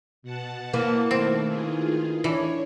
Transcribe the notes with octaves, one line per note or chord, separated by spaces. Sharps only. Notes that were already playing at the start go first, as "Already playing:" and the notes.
B2 F#5 A5
E3 A#3
D#3 A3 C4 E4
D#3 F4 G#4
E3 D4 C#5